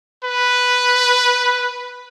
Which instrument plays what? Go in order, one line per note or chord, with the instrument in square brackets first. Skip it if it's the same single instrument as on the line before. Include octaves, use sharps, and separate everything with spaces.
[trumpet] B4